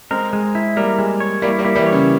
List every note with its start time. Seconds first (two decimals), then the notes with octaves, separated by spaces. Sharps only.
0.11 G#3 C4 A#4
0.33 G#3
0.55 E4
0.77 G3 A#3 A#4
0.99 G#3
1.20 C#5
1.42 G3 A#3 E4
1.59 G3 A#3
1.65 E4
1.76 E3 G3
1.86 C#5
1.92 C#3